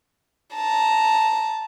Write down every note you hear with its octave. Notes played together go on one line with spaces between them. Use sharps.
A5 A#5